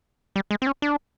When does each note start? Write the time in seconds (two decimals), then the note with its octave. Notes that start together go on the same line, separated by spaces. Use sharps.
0.36 G3
0.51 G#3
0.62 C4
0.67 C#4
0.82 D4